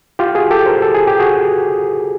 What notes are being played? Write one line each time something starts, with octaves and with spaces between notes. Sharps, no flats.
F4 G4
F#4 G#4
G4 A4
A#4 C5
A4
G#4
G4
F#4 G#4